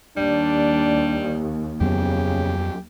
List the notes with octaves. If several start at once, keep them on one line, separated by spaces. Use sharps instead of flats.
D#2 G3 D4
F2 C#3 F#3 B3 G4